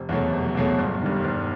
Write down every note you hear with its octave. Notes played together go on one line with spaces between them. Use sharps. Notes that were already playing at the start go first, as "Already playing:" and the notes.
Already playing: F1
E2 B2 F#3 A3
F1
E2 B2 F#3 A3
G1
G2 D#3
G1